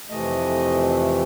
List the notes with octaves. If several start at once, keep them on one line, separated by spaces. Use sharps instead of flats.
F2 C3 E3 A3 D#5